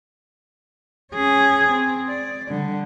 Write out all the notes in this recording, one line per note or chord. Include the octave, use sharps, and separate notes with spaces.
C#4 G#4
C4
D5
D3 G3